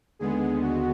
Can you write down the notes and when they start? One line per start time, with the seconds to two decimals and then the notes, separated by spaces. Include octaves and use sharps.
0.19 D#2 D3 G#3 B3 G#4
0.62 F#4